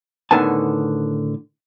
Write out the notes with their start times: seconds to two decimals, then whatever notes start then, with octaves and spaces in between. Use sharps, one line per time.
0.31 A2 D3 D#3 B3 G#5 A5